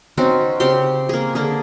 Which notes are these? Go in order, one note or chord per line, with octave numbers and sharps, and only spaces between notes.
C4 C#4 D#4 F#4
C#3 C4 G4 C6
A#3 G#4
D3 A#3 G#4